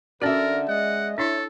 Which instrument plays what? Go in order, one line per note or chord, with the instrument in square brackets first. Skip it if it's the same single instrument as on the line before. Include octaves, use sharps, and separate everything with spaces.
[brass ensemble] D3 [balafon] C#4 F#4 [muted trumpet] A#4 [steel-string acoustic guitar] D5 E5
[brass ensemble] G#3 D#5 [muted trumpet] F#5
[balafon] D4 E4 [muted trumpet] A4 [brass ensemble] C#5